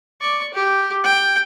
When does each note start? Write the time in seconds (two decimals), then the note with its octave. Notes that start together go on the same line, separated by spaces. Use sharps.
0.21 D5 C#6
0.54 G4
1.04 G5